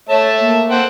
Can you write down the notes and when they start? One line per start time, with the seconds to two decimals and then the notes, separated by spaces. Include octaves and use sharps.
0.09 A3 C#5 E5 A5
0.40 A#3
0.70 C5 F#5 G5